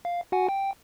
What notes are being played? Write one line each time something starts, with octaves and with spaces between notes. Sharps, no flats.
F5
F#4 F#5 G#5
G5